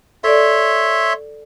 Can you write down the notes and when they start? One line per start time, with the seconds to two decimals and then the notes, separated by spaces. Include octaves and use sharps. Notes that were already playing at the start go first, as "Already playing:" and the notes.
0.24 A4 C#5 D5 E5 C6